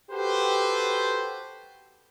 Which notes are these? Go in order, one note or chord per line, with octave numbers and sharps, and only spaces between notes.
F#4 G4 A4 B4 C5